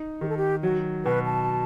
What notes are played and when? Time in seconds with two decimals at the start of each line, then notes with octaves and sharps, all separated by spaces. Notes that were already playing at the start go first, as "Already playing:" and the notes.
Already playing: D#4
0.21 D#3 G4
0.29 A4
0.37 G4
0.63 F#3 F#4
1.05 B2 B4
1.26 A5